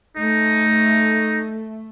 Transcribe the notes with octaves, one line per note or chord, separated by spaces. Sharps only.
A3 D#4